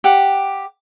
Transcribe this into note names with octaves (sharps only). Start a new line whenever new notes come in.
G4 F#5